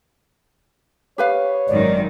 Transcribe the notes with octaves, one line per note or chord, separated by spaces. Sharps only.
G4 B4 C#5 F5
G#1 F#2 D#3 D5